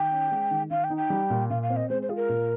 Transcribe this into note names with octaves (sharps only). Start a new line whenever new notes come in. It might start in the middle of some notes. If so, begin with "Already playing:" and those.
Already playing: D#3 G5
C#4
G#3
D#3
D#3 F5
G5
D#4
G5
G3
A#2
A#2 F5
F5
C4
D#5
G#3 C5
C5
F4 G#4
A#4
A#2